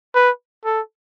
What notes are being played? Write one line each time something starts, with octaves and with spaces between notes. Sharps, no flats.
B4
A4